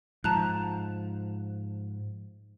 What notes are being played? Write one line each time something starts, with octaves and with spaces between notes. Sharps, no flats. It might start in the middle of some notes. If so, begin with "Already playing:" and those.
G#2 F3 A5 A#5 F#6